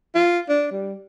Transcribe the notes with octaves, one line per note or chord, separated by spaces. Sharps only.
F4
D4
G3